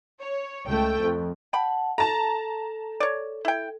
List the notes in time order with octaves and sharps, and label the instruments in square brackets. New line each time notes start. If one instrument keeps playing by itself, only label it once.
[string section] C#5
C#2 A3 G5
F2
[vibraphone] F#5 A5 [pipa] G5 B5
[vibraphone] A4 [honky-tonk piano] A5 A#5
[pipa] C#5 D5
E4 G5